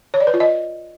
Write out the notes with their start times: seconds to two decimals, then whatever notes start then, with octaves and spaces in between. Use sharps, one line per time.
0.14 C#5
0.20 D5
0.27 B4
0.34 F4
0.40 D#5